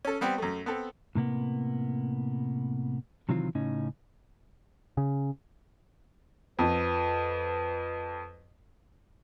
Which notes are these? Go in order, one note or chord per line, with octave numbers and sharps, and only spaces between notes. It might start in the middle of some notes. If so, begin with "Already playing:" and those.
C#4 A4
G3 B3 C4
F#2 A3
B3 C4 A4
A2 C3 A#3 B3
C3 D#3 E3 F#3 C4 F4
A2 C#3 C#4 D#4
C#3
F2 B4